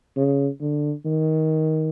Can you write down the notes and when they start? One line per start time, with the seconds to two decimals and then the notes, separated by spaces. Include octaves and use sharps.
0.17 C#3
0.61 D3
1.06 D#3